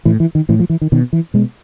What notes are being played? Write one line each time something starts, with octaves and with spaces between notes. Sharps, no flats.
A2 E3
E3
D#3
A2 E3
F3
E3
D#3
B2 D#3
E3
B2 G#3